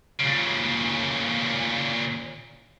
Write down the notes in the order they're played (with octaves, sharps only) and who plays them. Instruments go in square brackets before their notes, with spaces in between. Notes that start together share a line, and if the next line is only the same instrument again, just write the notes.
[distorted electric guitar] A#2 C#3